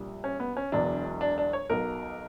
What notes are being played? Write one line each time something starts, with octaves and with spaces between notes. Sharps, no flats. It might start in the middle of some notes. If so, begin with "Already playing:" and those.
Already playing: A#1 A#2 G3
C#4
B3
C#4
E1 E2 B2 F#3 D4
D4
D4
C#5
B1 B2 F#3 A#4